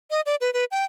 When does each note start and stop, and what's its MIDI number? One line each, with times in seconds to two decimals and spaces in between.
0.11 0.21 75
0.26 0.36 74
0.41 0.53 71
0.53 0.65 71
0.71 0.85 79